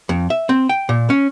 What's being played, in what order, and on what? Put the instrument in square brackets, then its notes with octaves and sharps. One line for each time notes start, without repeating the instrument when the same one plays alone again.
[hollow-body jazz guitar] F2
E5
C4
G5
A#2
C#4